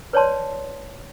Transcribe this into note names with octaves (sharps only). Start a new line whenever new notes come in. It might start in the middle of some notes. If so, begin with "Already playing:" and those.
B4 C#5 D5 A5 C6